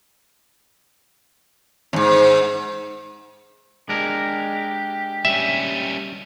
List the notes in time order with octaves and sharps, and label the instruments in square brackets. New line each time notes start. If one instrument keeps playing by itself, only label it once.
[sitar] E2 G#2
[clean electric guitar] G#3 D4 A#4 [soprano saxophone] G4
[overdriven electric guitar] G3 C#4 [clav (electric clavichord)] E5